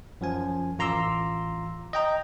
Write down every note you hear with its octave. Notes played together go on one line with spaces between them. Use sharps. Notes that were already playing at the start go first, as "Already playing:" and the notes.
F#2 F3 G#5
A1 F4 A#5 C6 D6 E6
D#5 G5 A#5